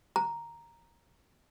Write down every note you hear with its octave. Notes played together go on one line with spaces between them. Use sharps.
A#5